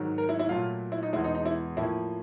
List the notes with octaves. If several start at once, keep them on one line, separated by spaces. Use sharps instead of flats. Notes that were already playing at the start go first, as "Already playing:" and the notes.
Already playing: G#2 D#3 F#3
A#4
E4
E4
A#2 F#3 A3 F4
E4
D#4
E2 B2 G#3 E4
D#4
D#4
E4
A2 F3 A#3 E4